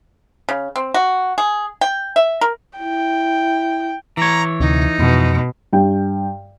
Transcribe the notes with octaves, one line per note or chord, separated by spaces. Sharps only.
C#3
C4
F#4
G#4
G5
E5
A#4
E4 G5
E3 C#5 A#5
D2 C3 D#4
F2 B2
G2 G5